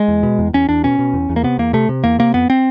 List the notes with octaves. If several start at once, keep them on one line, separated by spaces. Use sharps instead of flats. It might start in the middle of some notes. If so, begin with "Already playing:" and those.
Already playing: G#3
E2
B2
E2
E2 C#4
E2 D4
B2 C#4
B2
E2
E2
A#3
C3 B3
E2 A#3
C3 A3
C3
E2 A#3
C3 A#3
F2 B3
C4